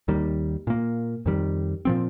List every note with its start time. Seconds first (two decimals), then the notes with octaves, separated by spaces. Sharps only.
0.08 D#2 D#3 G3 A#3
0.67 A#2 A#3
1.26 F2 D#3 G3
1.85 A#2 F3 C4